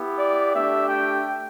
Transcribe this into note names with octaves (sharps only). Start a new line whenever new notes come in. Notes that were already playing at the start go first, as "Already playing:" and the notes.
Already playing: B3 E4 G4
D5
A3 D4 G4 E5
G5